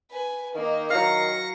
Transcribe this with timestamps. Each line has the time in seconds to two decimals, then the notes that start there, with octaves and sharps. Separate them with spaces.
0.11 B4 G#5
0.55 D#3 A#3 D#4
0.90 F#3 F5 A#6 C#7